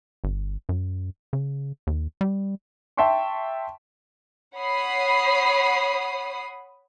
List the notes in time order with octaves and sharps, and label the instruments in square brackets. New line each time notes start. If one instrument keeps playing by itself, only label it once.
[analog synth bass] G1
F#2
C#3
D#2
G3
[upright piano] E5 G5 A5 C6 C#6
[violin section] C#5 F#5 B5 D#6 C7